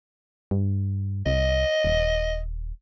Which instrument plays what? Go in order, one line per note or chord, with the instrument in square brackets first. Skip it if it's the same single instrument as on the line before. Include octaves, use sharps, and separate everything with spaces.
[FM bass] G2
[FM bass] C2 [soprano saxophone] D#5
[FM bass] D#1